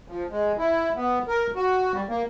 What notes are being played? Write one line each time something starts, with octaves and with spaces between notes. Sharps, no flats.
F3
G#3
E4
B3
A#4
F#4
G3
A#3